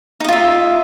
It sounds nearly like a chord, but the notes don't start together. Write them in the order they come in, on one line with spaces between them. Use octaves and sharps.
D#4 D#5 F4 E5